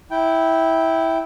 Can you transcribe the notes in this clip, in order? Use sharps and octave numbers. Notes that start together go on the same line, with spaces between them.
E4 G5